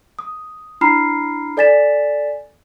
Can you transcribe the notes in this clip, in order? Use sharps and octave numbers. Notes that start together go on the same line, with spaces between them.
D#6
D4 E4 A#5 B5 F6 C7
A4 D5 G#5 A6 B6 E7